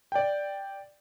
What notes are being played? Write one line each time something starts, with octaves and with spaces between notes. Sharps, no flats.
D5 G5